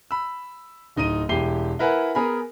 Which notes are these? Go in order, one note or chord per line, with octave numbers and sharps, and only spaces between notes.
B5 E6
D1 D#4 D#5 D#7
E1 E4 G4 C7 G7
E4 A#4 B4 E5 F#5 G#5
B3 G#4 A#4 G#5 A#5 B5